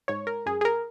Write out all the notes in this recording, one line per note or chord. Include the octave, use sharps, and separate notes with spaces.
G#2 C#5
A#4
F#2 G#4
G#4
A#4